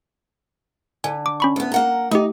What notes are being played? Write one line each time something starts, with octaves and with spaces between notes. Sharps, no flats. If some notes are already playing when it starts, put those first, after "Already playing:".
D3 G#5
D6
C#4 B5 C#6
D2 B3
A#3 F#5 A#5
A3 D#4 G4